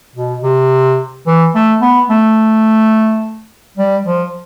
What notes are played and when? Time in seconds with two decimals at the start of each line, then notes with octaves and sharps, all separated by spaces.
0.15 B2
0.43 C3
1.27 E3
1.55 A3
1.82 B3
2.10 A3
3.78 G3
4.05 F3